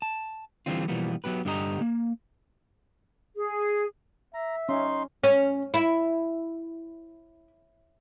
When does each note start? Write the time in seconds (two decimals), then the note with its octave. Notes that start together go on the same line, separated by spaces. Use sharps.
0.02 A5
0.66 D3 E3 F#3 G3 C4 F4
0.88 B2 E3 F3 G3 A#3 B3
1.24 F#3 B3 G4 B4
1.45 G2 D3 B3 G4 D#5 A#5
1.81 A#3
3.36 G#4
4.34 E5 A#5
4.69 C#4 D#4 C6
5.24 C#4
5.74 E4